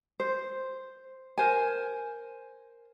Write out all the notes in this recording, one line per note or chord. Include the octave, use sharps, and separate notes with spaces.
C5
A#4 C5 G#5